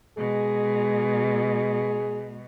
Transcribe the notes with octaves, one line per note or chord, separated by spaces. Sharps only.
B2 G#3 G#4